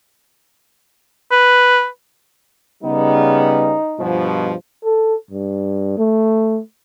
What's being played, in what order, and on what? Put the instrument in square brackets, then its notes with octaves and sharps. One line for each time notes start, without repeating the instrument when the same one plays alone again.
[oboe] B4
[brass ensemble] C#3 G3 B3 [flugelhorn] D#4
[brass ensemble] G2 B2 F3
[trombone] A4
G2
A3